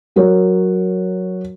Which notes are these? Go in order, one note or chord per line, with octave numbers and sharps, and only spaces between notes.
F#3 F#4 A#4 C#5